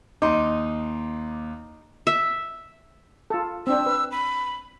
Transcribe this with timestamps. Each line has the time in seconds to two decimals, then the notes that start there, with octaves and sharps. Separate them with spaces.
0.22 D#2 D#4 C6 D6
2.07 E5
3.30 F4 A4
3.67 C4 D4 E6
3.86 B4
4.12 B5